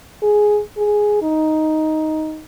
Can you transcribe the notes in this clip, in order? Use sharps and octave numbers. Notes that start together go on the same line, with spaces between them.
G#4
G#4
D#4